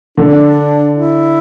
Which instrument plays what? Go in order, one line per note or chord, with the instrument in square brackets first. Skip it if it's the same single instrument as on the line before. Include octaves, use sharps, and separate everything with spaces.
[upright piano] D3 [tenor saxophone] D4
[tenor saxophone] E4